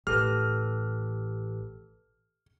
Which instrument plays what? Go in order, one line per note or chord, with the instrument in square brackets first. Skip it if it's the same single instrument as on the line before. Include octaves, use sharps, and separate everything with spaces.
[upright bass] A1 [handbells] G4 A4 B4 [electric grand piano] F6